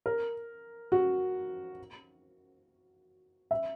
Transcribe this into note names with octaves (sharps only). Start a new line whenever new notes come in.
A#4
F#4
E5